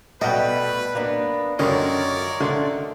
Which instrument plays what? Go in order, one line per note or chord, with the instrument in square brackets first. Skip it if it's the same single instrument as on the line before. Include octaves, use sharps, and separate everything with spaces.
[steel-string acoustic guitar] B2 A3 [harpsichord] G3 [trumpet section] B4 [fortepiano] D#5 F#5 G5
[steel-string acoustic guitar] A#3 B3 D4
[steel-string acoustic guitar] F#2 F4 [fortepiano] D3 C#4 [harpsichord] D#3 [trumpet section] A#4 C#5 D5
[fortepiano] D3 C6 [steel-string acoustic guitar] A3